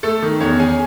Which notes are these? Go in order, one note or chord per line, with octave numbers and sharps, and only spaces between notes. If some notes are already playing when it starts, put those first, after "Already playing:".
A3 A4
D#3
E2 C#4 C#5
C#4 G#4 G#5